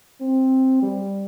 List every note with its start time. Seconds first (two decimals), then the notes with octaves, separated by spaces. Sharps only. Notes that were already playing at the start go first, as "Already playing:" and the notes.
0.21 C4
0.82 G3